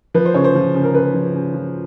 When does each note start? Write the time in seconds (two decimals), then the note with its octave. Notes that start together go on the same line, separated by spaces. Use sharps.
0.14 F3 B4
0.25 C5
0.34 C#3 C#5
0.44 C5
0.55 F3
0.75 C#3
0.83 A#4
0.94 C#3 B4
1.14 F3
1.34 C#3
1.54 F3